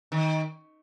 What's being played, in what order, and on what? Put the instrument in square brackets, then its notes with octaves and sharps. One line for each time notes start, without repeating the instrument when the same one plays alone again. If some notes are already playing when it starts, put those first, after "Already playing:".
[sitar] D#3